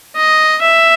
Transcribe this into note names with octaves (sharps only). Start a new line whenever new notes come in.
D#5
E5